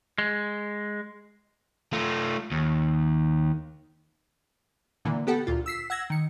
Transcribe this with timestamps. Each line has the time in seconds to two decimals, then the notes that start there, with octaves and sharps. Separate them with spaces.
0.18 G#3
1.93 A3 F4
2.52 D#2
5.05 A#2 D3 E3 A#3
5.27 B3 G4 A4 F#5
5.47 D2 A#2 F4
5.66 E6 B6 C7
5.90 F#5 E6 G#6 A#6
6.10 D#3 C#7